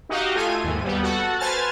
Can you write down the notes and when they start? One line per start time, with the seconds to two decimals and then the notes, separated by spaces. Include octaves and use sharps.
0.09 D#4 F#4 G4 D#5 F5
0.35 A3 F4 A4 G#5 D#7
0.64 D#2 G#2
0.83 G3 B3
1.02 F#4 A4 F#5
1.39 B4 C5 G#5 A5 F6 A6